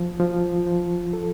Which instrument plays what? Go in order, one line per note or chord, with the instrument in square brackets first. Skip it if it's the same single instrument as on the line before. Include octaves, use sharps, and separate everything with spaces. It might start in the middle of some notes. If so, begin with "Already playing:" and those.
Already playing: [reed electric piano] F3
F3
F3
A4